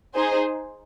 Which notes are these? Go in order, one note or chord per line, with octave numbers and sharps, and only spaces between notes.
D#4 G#4 C5